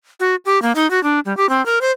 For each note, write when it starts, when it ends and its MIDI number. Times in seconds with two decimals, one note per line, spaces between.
0.20 0.35 66
0.45 0.61 67
0.62 0.72 58
0.75 0.89 63
0.91 1.02 66
1.03 1.20 62
1.25 1.36 55
1.37 1.49 67
1.49 1.64 60
1.66 1.79 70
1.81 1.91 72